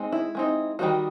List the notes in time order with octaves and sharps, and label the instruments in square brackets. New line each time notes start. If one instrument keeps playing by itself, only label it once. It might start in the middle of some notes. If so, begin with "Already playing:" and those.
Already playing: [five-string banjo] G#3 C4 D#4
E4
G#3 C4 D#4
D#3 G3 B3 D#4 F#4